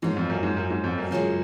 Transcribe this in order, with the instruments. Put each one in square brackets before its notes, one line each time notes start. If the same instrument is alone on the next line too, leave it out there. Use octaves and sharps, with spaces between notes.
[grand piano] G#2 [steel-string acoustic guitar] F3 A#3 C#4
[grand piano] F2
F#2
G#2
F#2
G#2
F2
F#2
[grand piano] F#2 [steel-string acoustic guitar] C#3 G#3 C#4 F4